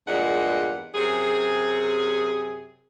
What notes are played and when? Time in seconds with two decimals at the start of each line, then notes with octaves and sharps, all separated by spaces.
0.07 E2 G2 A#2 G#3 F#5
0.95 F#2 C3 G#4